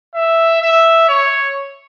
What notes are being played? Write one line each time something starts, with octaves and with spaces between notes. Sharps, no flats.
E5
E5
C#5